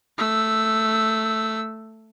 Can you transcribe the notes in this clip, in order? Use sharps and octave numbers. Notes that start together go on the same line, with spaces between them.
A3 E6